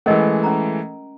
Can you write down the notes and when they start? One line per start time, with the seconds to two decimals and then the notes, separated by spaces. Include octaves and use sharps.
0.06 E3 G#3 A3 C#4 A#4 D#5
0.44 C#4 A#5